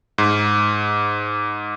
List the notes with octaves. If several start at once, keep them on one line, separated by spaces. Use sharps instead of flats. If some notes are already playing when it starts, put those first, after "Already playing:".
G#2